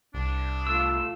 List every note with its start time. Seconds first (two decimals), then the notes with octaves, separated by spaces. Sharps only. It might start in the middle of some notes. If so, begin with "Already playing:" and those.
0.14 C2 D4
0.67 A3 F4 E6